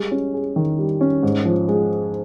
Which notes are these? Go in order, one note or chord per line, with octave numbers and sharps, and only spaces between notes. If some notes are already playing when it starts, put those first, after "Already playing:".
Already playing: G3 G#3
C#4
G#4
D#3
G3
C#4
G#2
F3
G#3